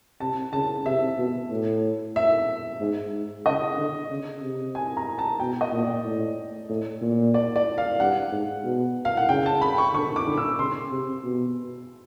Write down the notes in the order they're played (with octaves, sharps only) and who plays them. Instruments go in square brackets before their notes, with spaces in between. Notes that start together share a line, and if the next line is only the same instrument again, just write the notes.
[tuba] C3 [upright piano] A5
[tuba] C#3 [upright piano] A5
[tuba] C3 [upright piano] E5
[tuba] B2
A2
[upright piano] E5
[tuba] G#2
G#2
[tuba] C#3 [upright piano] D#5
[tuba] D3
C#3
C3
[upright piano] G#5
A#5
A5
[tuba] B2 [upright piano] G5
[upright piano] D#5
[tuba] A#2
[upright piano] D5
[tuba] A2
A2
A#2
[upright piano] D5
D5
F5
[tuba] G2 [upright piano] F#5
[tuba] G#2
B2
[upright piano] F5
F#5
[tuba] C#3 [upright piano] G5
[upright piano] A5
B5
C#6
[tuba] D3 [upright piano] C#6
[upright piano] D6
[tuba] D3
[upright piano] E6
[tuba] C#3 [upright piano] C6
[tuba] C3
B2